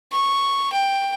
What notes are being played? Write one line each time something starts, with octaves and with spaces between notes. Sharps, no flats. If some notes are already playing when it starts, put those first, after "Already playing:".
C#6
G5